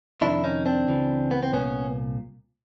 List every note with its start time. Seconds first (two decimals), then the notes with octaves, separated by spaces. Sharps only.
0.21 F2 C3 D#3 D4 E4
0.44 C#4 D#4
0.66 C4 D4
0.87 C#2 C#3 E3
1.31 B3
1.43 C4
1.53 C2 A#2 B3 C#4